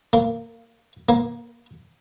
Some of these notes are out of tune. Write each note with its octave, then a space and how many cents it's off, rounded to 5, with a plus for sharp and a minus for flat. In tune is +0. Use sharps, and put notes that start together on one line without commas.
A#3 -20
A#3 +20